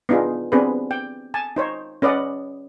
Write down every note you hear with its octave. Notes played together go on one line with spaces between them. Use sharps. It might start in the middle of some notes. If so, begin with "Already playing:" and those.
B3 D4 D#4 F4 G#4
B3 C4 D4 G#4 B4
G5
G#5 A5
D#4 C5 C#5
C#4 B4 D5 D#5 F#5